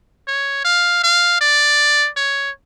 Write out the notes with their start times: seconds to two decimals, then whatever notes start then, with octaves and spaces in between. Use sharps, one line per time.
0.27 C#5
0.65 F5
1.03 F5
1.41 D5
2.17 C#5